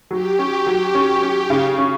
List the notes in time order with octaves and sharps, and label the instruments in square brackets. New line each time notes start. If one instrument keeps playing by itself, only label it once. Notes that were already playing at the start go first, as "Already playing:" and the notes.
[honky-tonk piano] F#3 [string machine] G4
[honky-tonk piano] C#4
F#3
C#4
C#4
C#3
C#4